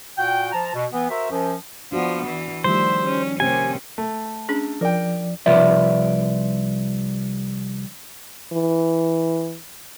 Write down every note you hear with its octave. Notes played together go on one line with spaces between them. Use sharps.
A#2 F#4 F#5 G5
F3 A5 A#5
B2
E3 B3
F#4 A#4 C5 E5
F#2 F3
F3 B3 D4 F#4
E3
D#3 F3 G3 A3 C5 E5
C#4
C3 A#3 C4 C#4 G4 G#5
A3
C#4 D4 G#4
F3 A#4 D5 G5
C2 F3 F4 B4 D5 E5
E3